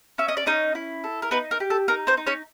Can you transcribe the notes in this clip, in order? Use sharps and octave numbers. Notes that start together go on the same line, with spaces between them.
C#4 E5
D#5
D5
C#4 D#4 D#5
E4
A4
A#4
B3 D#4 B4
A#4
G4
A4
D#4 A#4
C4 C5
D#4
C#4 C#5